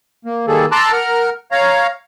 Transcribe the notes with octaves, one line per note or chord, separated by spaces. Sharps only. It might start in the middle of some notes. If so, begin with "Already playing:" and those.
A#3
D#3 G3 A#3 G#4 A4
A5 A#5 C6 D6 E6 F#6
A#4 F#5 A#5 F6
C#5 F5 A#5